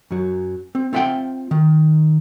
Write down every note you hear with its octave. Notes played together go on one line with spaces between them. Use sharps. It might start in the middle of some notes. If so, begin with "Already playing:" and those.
F#2 F#3
C4
C4 F4 E5 F#5 G5
D#3